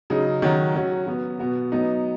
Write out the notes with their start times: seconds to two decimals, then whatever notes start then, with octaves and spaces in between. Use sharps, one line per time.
0.10 C#3 F#3 D#4
0.42 D#3 F#3 C#4 F#4
0.75 F#3 C#4 F#4
1.07 F#3 B3 F#4
1.39 B2 B3 F#4
1.72 F#3 B3 D#4